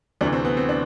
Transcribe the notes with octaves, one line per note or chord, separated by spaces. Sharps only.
D2 C3 E3 D4
C4
B3
C4
D4